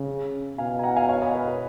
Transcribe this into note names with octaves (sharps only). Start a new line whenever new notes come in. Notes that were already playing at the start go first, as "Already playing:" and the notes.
Already playing: C#3
B2 F5 G#5
G#5
F#5 A#5
F5 G#5
C#5 F5
B4 D#5
B4
B4